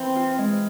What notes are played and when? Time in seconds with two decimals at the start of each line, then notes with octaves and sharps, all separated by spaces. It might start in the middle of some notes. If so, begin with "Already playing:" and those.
Already playing: E3 C4
0.16 F4
0.38 G#3